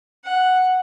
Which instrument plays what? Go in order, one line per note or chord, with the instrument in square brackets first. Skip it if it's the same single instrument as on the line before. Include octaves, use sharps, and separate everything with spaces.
[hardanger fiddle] F#5